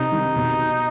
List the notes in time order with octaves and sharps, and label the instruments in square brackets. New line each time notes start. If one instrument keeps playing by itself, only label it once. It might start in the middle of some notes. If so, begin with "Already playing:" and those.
Already playing: [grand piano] C3 [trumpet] D#4
[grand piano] D#3
B2